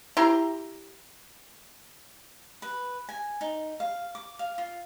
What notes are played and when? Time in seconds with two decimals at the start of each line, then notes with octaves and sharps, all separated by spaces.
0.17 E4 G4 A#5 C6
2.62 B4
3.09 G#5
3.41 D#4
3.80 F5
4.15 D6
4.39 F5
4.58 F4